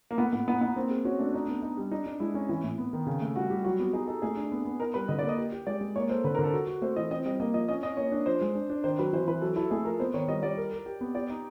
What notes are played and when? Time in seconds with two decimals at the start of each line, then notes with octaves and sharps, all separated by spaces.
0.11 A#3
0.18 A3 B3
0.33 A2 B3
0.47 B3 D#4
0.61 B3 D#4
0.76 A#3 C4
0.90 G#4
1.05 C#4 F#4
1.19 A3 D4
1.34 D4 D#4
1.48 B3
1.62 D#4
1.77 G3
1.91 D4 D#4
2.06 D4
2.20 G#3 E4
2.34 C#4
2.49 E3
2.63 A2
2.78 B3
2.93 D#3
3.07 C#3
3.22 A3
3.36 G3 F#4
3.50 G3 G4
3.64 F#3 F#4
3.79 B3 G4
3.93 D#4 G#4
4.07 D#4 A4
4.22 A3 G#4
4.37 D4
4.52 B3
4.65 B3
4.80 D#4 A#4
4.94 G3 B4
5.08 D3 D#5
5.19 D5
5.23 A#3
5.29 D#5
5.38 G4
5.52 G4
5.67 G#3 D5
5.81 G#3
5.96 A#3 C#5
6.09 A4 C5
6.24 D3 B4
6.35 A#4
6.39 D3
6.44 A4
6.53 F#4
6.67 F#4
6.82 A3 C5
6.96 E3 D#5
7.11 C4 D#5
7.25 G3 D#5
7.40 A#3 D#5
7.54 F3 D#5
7.68 C#4 D#5
7.83 C#4 D#5
7.97 A#3 C#5
8.12 D4
8.26 F3 C5
8.41 G#3
8.55 D4
8.70 D4
8.84 D#3 C5
8.99 F#3 B4
9.13 E3 C5
9.28 E3 B4
9.41 F#3 A4
9.56 E4 A4
9.71 A3 G#4
9.85 F3 A#4
10.00 B3 C5
10.14 D#3 C#5
10.28 G3 D#5
10.43 G3 D5
10.57 A#4
10.72 A#4
10.86 G4
11.01 B3
11.15 G4 D5
11.29 D#4